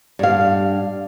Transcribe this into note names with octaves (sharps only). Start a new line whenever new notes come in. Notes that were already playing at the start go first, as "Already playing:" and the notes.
G2 F5